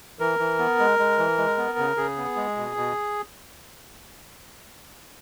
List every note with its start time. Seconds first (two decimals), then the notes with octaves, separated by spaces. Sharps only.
0.19 E3 A#4
0.39 E3
0.59 B3
0.79 G#3
0.99 G#3
1.19 E3
1.38 G#3
1.57 B3
1.78 C#3
1.97 C#3 G#4
2.17 B3
2.36 G#3
2.57 B2
2.76 B2